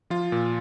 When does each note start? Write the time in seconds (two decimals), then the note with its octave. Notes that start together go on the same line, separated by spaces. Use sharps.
0.10 F3 F4
0.32 A#2